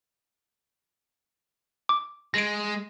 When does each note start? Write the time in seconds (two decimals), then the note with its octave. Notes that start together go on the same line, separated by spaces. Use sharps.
1.89 D6
2.34 G#3 A#6 D7